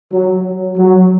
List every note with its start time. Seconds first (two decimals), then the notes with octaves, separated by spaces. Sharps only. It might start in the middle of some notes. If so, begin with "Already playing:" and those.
0.12 F#3
0.77 F#3